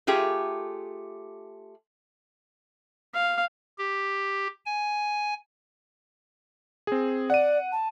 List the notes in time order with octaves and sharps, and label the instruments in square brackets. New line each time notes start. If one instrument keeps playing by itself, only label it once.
[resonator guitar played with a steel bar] A3 F4 G4 G#4
[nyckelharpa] F5
[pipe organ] G4
G#5
[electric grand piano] C4 G#4
[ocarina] D5 [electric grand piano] F#5 D#7
[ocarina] A5